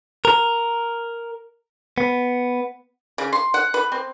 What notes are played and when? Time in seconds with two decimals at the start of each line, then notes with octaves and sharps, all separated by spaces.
0.25 A#4
1.98 B3
3.18 C#3
3.33 C6
3.54 F#5
3.74 B4
3.92 C4